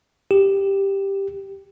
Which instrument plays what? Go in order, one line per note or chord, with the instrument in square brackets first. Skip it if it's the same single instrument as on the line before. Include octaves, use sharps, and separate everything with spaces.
[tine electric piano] G4